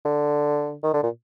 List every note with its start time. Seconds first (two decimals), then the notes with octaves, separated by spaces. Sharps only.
0.05 D3
0.83 D#3
0.94 D3
1.03 A#2